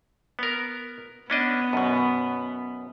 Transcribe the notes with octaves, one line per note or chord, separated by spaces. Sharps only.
B3 A#4
B3 C#4 D4 D#5
F#2 B2